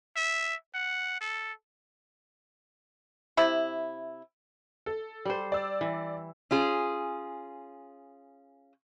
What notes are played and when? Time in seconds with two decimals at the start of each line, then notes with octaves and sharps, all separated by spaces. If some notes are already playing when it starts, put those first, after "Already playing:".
0.16 E5
0.74 F#5
1.21 A4
3.37 C3 E4
4.86 A4
5.25 G3 C5
5.52 D5 E6
5.81 E3
6.51 C#4 F4 G#4